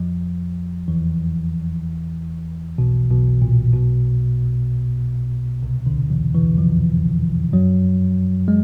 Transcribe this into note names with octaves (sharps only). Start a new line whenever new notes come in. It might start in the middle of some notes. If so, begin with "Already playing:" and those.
Already playing: F2 F3
E2 E3
B1 B2
B1 B2
A#2
B1 B2
C2 C3
D2 D3
E2 E3
E2 E3
F2 F3
F#2 F#3
G#3